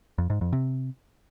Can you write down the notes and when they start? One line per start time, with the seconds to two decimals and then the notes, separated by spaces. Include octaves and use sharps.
0.18 F2
0.30 G#2
0.41 F2
0.53 C3